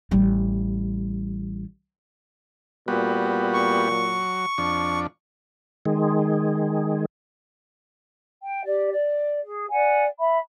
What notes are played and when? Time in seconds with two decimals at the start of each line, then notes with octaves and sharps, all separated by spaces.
0.11 A1 G3
2.88 A#2 G3 B3 F#4
3.54 C#6
3.91 F#3
4.58 F2 D4
5.86 D#3 G#3
8.43 G5
8.64 G4 D5
8.92 D5
9.42 G#4
9.70 D5 F#5 G#5
10.20 E5 B5